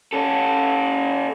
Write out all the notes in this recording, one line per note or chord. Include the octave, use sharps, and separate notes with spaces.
C#4 A4